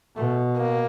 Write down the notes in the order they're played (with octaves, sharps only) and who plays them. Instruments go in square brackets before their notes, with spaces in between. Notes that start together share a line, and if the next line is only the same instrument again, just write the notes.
[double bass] B2 [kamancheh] A3
[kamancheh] A#3